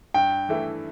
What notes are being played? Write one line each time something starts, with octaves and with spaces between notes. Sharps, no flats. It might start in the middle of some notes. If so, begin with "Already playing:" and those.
G2 G5
E3 A3 E4